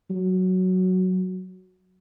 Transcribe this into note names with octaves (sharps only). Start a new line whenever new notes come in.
F#3